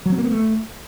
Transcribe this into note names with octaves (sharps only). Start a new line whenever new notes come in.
F#3
C4
A#3
B3
A3